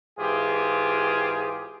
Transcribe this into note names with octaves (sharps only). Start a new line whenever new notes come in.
G#2 E3 F4 G4 G#4